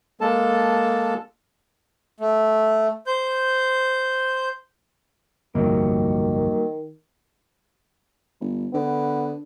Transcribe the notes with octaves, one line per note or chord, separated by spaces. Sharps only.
G#3 A#3 A4 A5
A3
C5 G6
G1 C2 F2 D#3 F#3 G3 A#3
G1
D3 B3